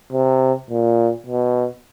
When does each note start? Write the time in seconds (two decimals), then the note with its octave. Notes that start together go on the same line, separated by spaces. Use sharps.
0.13 C3
0.70 A#2
1.27 B2